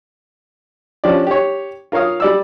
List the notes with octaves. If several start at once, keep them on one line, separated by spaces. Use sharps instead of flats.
F3 C#4 D4 G4 D5
G4 C#5
F4 A#4 C#5 F5 D#6
G3 D5 E6